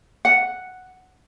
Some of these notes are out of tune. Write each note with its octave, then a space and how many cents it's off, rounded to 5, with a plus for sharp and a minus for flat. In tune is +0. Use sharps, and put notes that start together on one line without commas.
F#5 +0